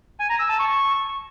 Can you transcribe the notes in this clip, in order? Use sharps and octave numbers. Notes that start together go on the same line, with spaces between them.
G#5
A#5
E6
A5
C#6